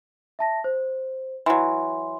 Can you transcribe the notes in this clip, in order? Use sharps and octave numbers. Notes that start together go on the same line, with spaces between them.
E5 A5 A#6
C5
E3 F#3 C6